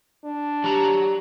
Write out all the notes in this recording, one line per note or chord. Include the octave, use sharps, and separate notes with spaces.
D4
F#3 G4 A#5